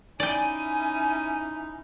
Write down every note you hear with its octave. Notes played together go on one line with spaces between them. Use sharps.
C#4 D#4 E4 D5 G5 G#5